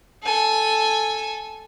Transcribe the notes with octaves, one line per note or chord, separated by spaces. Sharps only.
A4 G#5